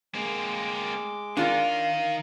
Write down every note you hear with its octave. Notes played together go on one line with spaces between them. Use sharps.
G#3 A#3 C4 D6
D#3 D4 D#4 F4 A#4 F5